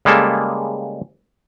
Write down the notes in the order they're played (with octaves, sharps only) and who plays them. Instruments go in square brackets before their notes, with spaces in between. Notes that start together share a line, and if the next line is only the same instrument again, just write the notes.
[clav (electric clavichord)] C#3 G3 G#3 A#3 A4